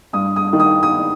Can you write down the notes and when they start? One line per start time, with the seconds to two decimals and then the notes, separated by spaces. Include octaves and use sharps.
0.13 G2 D#6
0.36 D#6
0.53 D#3
0.60 D#6
0.83 D#6